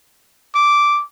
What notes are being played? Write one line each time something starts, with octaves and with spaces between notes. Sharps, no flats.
D6